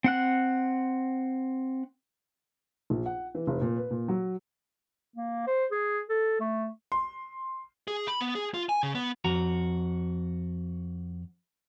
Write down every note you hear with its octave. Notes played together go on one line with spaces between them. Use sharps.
C4 F#5 F#6
A#1
F#5
E3
F1
A#2
B4
A#2
F#3
A#3
C5
G#4
A4
A3
C6
G#4
B5
B3
G#4
F4
G#5
C#3
B3
F2 F#4 A#5